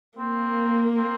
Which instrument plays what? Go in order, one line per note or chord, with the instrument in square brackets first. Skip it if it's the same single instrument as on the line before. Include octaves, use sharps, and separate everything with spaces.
[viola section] A#3 [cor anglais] C4
[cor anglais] C4